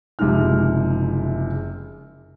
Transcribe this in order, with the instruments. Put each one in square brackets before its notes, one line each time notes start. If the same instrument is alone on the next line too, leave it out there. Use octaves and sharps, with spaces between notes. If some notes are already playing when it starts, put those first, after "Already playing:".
[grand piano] F#1 C3 F3 G#3 D#4 F6